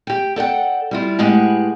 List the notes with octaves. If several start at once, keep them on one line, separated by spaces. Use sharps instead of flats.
G4 G5
A4 D5 F#5 G5
G3 E4 F4
A2 G#3 G4 G#4 B4 F#5